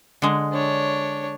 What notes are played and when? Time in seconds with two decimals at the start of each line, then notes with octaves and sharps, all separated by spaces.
0.22 D3 G#3
0.53 D4 C#5